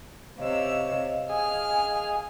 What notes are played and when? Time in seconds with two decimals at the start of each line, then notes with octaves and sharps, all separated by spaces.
0.38 C3 C#5 D#5 F5 E6
1.29 G#4 G#5 F6